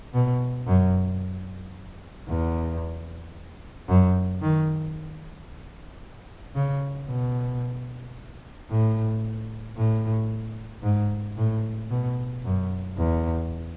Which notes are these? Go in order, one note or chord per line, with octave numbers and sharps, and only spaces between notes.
B2
F#2
E2
F#2
D#3
C#3
B2
A2
A2
G#2
A2
B2
F#2
E2